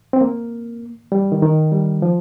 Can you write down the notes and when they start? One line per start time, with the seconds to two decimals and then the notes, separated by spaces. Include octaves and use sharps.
0.13 C4
0.21 A#3
1.12 G3
1.32 D#3
1.42 D#3
1.72 G3
2.02 F3